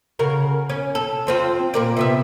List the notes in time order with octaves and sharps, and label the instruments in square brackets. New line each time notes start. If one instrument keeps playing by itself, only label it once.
[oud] C#3 F#4 A#4
C#4
A4
F2 C4 F4
A#2 A#4 D5
C3 B3 E5